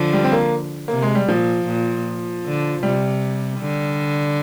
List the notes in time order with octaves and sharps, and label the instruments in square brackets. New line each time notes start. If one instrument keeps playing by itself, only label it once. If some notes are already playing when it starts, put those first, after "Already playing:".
Already playing: [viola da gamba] D3 F3
[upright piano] G3
C4
A#3
[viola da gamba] C3 [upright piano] A#3
[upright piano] G#3
G3
[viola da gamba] A#2 [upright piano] F3
[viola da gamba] A#2
D3
[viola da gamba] C3 [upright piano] G3
[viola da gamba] D3